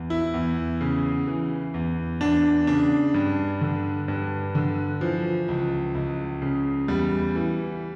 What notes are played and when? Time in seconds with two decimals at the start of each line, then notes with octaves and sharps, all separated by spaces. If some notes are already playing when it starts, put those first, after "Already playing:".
Already playing: E2
0.10 E4
0.34 E2
0.81 C#3
1.27 E3
1.74 E2
2.21 E2 D4
2.67 C#3 D4
3.14 G2
3.61 D3
4.08 G2
4.55 D3
5.01 E3 F3
5.48 C#2
5.95 C#2
6.42 C#3
6.88 E2 G3
7.35 E3